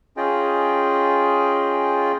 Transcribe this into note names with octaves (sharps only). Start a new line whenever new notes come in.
C#4 F4 G#4 D#5 G5